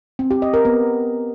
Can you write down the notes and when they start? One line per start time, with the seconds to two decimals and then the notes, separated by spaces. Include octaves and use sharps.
0.19 C4
0.31 G4
0.42 D#5
0.54 A#4
0.65 B3